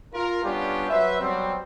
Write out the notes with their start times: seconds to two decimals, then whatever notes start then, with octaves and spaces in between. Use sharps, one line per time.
0.14 F4 A#4
0.44 G3 B3 C#4 D4 F4 G4
0.89 F#3 B4 C5 E5
1.20 F#3 G3 B3 C4